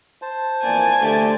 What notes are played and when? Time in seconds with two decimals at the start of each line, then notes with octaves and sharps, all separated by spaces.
0.22 C5 A5
0.64 F2 E3 A#3 D5 G#5
1.01 D3 A3 G4 D5